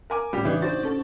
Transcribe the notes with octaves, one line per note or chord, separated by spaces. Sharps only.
A#4 G#5 D6
A2 C#3 G3 G4
E3 D4 D#4 G4
F#4 C5 A6
C#4 A4